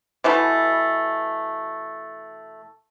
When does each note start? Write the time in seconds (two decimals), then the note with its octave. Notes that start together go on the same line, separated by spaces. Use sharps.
0.24 B2 E3 A3